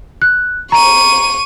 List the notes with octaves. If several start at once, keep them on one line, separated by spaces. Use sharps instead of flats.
F#6
A#5 C#6 D#7